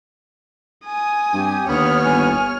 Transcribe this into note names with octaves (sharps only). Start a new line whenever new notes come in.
G#5 D#6
G2 C4 G4
D#2 D3 B3 C#5 B5 D#6 F6
G1 G#5